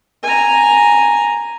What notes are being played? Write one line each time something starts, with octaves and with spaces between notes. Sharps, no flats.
G#5 A#5